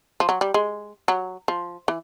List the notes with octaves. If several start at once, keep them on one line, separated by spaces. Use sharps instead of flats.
F3
F#3
G3
G#3
F#3
F3
E3